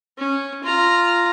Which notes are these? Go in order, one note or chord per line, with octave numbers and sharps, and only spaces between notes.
C#4
F4 A#5